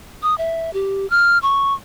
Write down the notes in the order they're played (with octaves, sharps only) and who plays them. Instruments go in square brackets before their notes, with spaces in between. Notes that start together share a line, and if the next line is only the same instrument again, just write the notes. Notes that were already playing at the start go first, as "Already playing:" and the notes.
[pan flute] D#6
E5
G4
F6
C#6